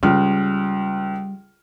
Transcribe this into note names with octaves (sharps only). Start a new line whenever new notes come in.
C#2 G3 F6